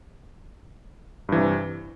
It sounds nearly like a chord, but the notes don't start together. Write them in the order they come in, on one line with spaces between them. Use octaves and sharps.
G2 E3 C3